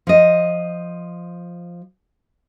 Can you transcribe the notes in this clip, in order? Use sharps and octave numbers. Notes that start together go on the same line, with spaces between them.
F3 D#5